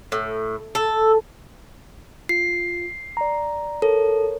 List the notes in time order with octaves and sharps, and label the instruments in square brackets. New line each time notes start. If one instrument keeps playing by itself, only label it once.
[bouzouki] A2
A4
[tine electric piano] F4 [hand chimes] C7
[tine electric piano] D5 A#5
[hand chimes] A4 [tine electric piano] A#4 C#5